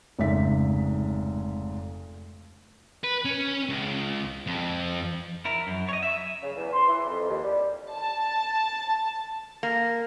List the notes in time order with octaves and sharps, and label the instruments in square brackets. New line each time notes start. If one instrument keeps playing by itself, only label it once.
[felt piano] F1 G#2 C#3 E5 B6
[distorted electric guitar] B4
C#4
C#2
F2
[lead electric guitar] E4 A#4
F#2
C#5 D#5
E5
[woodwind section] C#3
E2
C6
E3
F2
D#2
G3
[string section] A5
[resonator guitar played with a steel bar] A#3